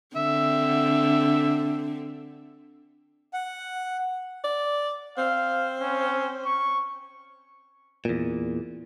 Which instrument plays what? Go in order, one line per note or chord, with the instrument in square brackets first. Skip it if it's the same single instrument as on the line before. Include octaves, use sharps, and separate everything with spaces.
[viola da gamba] D3 C4 [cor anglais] E5
[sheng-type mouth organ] F#5
[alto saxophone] D5
[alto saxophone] C4 [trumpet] F5
[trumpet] C#4
C#6
[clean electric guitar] E2 A#2